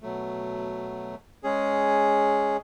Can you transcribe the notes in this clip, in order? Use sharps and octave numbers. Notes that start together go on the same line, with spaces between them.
B2 F#3 A3
G#3 C#4 G#4